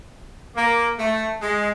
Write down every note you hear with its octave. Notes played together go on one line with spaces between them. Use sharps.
A#3
A3
G#3